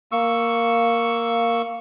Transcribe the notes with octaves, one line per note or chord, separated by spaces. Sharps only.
A#3 C#6 E6